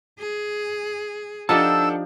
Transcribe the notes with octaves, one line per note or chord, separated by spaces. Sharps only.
G#4
F3 D4 D#4 G4 A4 F#5 A5 E6